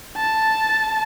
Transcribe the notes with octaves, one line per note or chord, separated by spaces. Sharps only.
A5